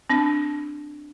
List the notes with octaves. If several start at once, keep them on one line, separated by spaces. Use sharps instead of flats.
C4 D4